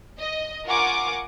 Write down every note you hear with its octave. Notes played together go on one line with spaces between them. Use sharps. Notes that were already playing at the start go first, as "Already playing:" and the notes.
D#5
F4 A#4 F#5 G#5 C#6 D6